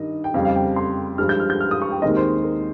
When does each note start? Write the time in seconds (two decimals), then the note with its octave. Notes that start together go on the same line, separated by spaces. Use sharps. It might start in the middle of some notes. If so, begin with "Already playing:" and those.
Already playing: G2 D#3 D#5
0.24 G5
0.34 F2 C#3 G3 C4 D#4 F5
0.45 F5
0.55 G5
0.76 C6
1.18 G2 F3 G#3 F6
1.29 G6
1.40 F6
1.50 G6
1.60 F6
1.71 D#6
1.82 C#6
1.91 G5
2.02 D#2 D#3 G#3 C4 D#5
2.17 C5
2.44 A#4